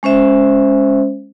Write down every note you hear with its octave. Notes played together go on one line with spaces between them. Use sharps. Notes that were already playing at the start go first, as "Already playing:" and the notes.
G#3 C#4 C5 E5